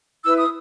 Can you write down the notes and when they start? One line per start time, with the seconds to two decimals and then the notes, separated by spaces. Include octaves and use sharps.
0.24 E4 B4 E6
0.38 D#6